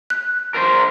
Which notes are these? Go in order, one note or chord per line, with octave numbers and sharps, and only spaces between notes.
F#6
A#4 C5